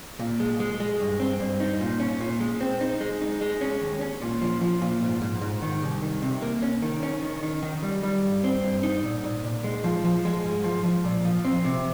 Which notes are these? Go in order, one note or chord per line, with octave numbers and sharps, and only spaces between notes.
A#2
G#3
G#3
G#3
G2
C4
G2
D#4
A#2
C#4
A#2
G#3
C4
D#4
G#3
D#4
G#3
C#4
D#2
C#4
A#2
F3
F3
A#2
G#2
G#2
G#2
D#3
C2
D#3
C3
A#3
C#4
D#3
C#4
D#3
D#3
D#3
G3
G3
G2
C4
G2
D#4
A#2
A#2
A#2
G#3
F3
F3
G#3
G#2
F3
F3
A#2
F3
C4
C3